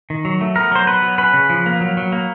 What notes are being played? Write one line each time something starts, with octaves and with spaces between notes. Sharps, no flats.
D#3
F#3
A3
B3 A#4
F#3 C5
B3 B4
F#3
C#4 B4
C#3
F3
A#3
F#3
F#3
A#3